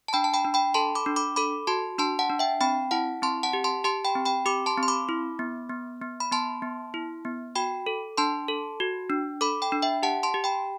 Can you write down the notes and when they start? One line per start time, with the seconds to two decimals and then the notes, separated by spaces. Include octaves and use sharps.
0.08 A5
0.13 D4 G5 B5
0.24 A5
0.34 G5 B5
0.45 D4
0.54 G5 B5
0.74 A4 A5 C6
0.95 B5 D6
1.06 D4
1.16 B5 D6
1.36 A4 B5 D6
1.67 F#4 A5 C6
1.98 D4 A5 C6
2.19 F#5 A5
2.30 D4
2.39 E5 G5
2.61 C4 G5 B5
2.91 E4 F#5 A5
3.22 C4 A5 C6
3.43 F#5 A5
3.53 G4
3.64 A5 C6
3.84 G4 A5 C6
4.05 G5 B5
4.16 C4
4.25 G5 B5
4.46 G4 B5 D6
4.66 A5 C6
4.78 C4 C6
4.88 B5 D6
5.09 E4
5.39 B3
5.69 B3
6.02 B3
6.20 B5
6.32 B3 A5 C6
6.62 B3
6.94 E4
7.25 B3
7.55 F#4 G5 B5
7.86 A4
8.17 D4 A5 C6
8.48 A4
8.80 F#4
9.10 D4
9.41 A4 B5 D6
9.62 G5 B5
9.72 D4
9.82 E5 G5
10.03 G4 F#5 A5
10.23 A5 C6
10.34 G4
10.44 G5 B5